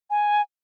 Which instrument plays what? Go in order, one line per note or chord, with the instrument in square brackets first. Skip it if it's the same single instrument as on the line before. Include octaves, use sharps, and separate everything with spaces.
[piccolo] G#5